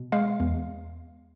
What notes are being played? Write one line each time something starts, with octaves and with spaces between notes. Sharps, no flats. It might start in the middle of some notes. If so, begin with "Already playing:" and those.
Already playing: B2
G#3 F5
E2